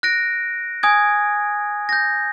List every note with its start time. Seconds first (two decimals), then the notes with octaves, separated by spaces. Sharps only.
0.03 F#6 A#6 D7
0.83 G#5 D#6 G#6
1.89 G6 A#6